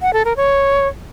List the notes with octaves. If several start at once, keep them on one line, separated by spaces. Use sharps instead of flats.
F#5
A4
A#4
C#5